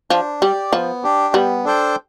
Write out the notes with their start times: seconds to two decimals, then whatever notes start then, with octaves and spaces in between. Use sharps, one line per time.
0.10 F3 D4
0.42 G3 G4 D5
0.73 F3 B3
1.03 D4 G4
1.34 G3 B3
1.64 D4 A4 C5 G5